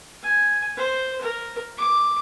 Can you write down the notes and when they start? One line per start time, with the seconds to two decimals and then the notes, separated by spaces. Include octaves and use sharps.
0.23 G#5
0.77 C5
1.21 A#4
1.77 D6